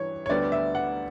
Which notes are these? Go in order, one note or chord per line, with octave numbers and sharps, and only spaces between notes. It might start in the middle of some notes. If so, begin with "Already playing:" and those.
Already playing: G2 E3 C#5
C#5
D2 D3 G3 B3 D5
E5
F#5